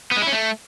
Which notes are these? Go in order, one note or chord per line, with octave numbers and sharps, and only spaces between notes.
B3
G#3
E4
C#4
A3